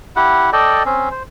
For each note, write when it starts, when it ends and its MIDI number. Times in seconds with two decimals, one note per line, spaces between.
0.16 0.50 64
0.16 0.50 67
0.16 0.50 78
0.53 0.83 69
0.53 0.83 74
0.53 0.83 75
0.53 0.83 79
0.86 1.09 60
0.86 1.09 61
1.11 1.23 72